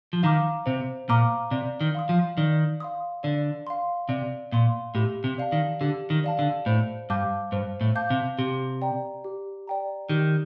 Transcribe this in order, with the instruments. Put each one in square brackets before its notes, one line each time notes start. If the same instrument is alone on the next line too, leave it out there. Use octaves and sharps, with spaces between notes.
[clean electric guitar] F3
[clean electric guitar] D#3 [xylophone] F5 A#5 D6 F6
[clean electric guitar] C3 [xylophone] C5
[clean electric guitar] A#2 [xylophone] F5 A#5 D6 F6
[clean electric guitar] C3 [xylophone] D5
[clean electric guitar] D#3
[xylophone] F5 C6 D#6
[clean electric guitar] F3
[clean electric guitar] D#3 [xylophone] D5
[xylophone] F5 C6 D#6
[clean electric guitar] D3 [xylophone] D5
[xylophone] F5 C6
[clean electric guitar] C3 [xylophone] D5
[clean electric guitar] A#2 [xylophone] F5 C6
[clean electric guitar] A2 [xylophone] G4
[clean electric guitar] C3
[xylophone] D5 F5 A5
[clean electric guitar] D#3
[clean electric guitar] D3 [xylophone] G4
[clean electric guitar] D#3
[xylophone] D5 F5 A5
[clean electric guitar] D3
[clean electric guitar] A2 [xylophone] C5
[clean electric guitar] G2 [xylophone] F5 A5 D6 G6
[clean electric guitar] G2 [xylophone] C5
[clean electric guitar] A2
[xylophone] F5 A5 D6 G6
[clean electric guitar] C3
[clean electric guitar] C3 [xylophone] G4
[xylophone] D5 G5 A#5
G4
D5 G5 A#5
[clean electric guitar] D#3 [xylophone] G4